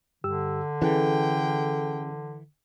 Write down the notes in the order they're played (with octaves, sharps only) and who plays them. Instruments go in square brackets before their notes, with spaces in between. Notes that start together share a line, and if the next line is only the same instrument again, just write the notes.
[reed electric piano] G2 G4 E6 [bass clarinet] D3
[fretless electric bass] E3 [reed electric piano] C#4 G#4 A4 [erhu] G5